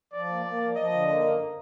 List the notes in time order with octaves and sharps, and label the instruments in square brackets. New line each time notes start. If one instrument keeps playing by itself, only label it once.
[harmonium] F3 [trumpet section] D5
[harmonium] A#3
A#3
F3
[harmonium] F3 [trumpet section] D#5
[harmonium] D3
A#3
F#2